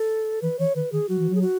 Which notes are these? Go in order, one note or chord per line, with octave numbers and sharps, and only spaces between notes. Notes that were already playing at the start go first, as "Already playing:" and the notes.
Already playing: A4
E3 B4
E3 C#5
D#3 B4
D#3 G#4
F#3 F#4
E3
F#3 G#4
F#4